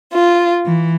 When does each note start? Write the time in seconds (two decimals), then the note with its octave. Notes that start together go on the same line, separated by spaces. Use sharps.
0.12 F4
0.65 E3